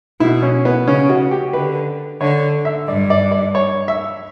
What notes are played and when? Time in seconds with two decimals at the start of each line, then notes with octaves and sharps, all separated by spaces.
0.20 B2 E4
0.43 C#4
0.65 B3
0.87 C#3 C#4
1.09 F#4
1.31 G4
1.53 D3 B4
2.21 D3 C#5
2.65 E5
2.88 G2 D5
3.10 D5
3.31 D5
3.55 C#5
3.88 E5